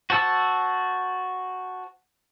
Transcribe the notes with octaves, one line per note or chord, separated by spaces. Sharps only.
F#4 C5 A5 E6